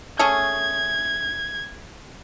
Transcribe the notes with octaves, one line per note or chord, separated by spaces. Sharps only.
A3 C#4 G#4 G#6